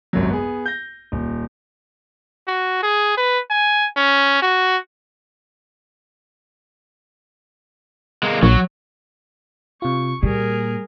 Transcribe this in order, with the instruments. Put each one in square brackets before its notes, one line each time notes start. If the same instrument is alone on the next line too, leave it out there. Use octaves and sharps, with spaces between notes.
[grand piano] G#1 F#2 C3 F#3
B3 G#4
G6 A#6
D#1
[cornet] F#4
G#4
B4
G#5
C#4
F#4
[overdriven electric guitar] G#3 A#3
[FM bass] A#1 [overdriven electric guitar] F#3
[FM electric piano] C3 F4 [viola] C#6
[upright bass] A#2 [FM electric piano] G3 [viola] G#4 A#4